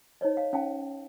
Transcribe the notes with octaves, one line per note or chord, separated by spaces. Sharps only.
D#4 C5 C#5 D#5
F5
C#4 F5 G5 A5